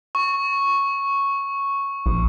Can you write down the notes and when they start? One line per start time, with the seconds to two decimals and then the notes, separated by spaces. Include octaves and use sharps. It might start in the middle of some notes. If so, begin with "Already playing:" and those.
0.15 C#6
2.06 A#1